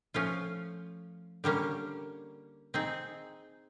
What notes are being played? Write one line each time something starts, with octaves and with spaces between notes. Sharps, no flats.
F3 A3 C#4 F4
D3 G3 A#3 C#4
C4 D#4 G#4